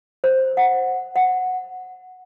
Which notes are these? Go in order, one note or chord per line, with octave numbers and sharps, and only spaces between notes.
C5
F#5
F#5